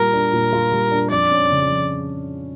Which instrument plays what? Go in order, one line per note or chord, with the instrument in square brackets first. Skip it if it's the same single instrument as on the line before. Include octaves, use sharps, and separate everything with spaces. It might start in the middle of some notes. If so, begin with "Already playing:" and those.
Already playing: [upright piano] A#2 G3 F4 [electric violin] A#4
[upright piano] D4
A#2
F4
G3
D4
[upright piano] F2 [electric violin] D5
[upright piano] C#4
C#3
F3